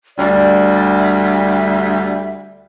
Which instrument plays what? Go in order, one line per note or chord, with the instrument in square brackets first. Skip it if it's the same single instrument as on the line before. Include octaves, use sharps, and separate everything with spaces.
[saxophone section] D2 G3 [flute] D5
[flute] E5